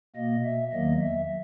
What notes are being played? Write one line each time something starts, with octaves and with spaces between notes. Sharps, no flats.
B2 A#3 D#5
E5
E2 D#3 F#3 A#3 D#5
E5